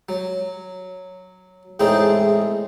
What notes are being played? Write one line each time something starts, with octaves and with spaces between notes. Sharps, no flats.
F#3
E2 A2 G#3 C4 D#4